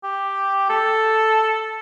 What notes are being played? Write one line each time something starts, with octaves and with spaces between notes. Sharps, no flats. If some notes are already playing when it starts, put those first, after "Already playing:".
G4
A4